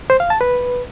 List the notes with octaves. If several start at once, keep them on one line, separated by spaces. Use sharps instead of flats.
C5
F5
A5
B4